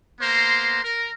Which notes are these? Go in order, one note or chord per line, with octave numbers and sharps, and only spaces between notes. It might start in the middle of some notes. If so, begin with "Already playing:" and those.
A#3 B3 C5 A#5 C6
A#4